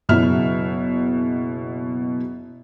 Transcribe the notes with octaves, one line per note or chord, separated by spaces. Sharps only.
F#1 B2 E4 E5 F6